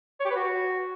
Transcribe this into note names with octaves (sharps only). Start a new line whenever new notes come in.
C#5
G4
B4
F#4